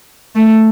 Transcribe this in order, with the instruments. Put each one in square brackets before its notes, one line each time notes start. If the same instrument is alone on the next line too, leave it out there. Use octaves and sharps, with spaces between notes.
[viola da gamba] A3